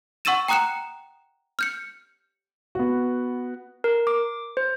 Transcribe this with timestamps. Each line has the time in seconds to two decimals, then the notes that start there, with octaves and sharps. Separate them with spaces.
0.25 F#5 C#6 E6 A6 D#7 E7
0.48 G5 A#5 D#6 F#6 C#7 E7
1.59 F6 G6 C#7
2.75 B3 F#4
3.84 A#4
4.07 D6
4.57 C5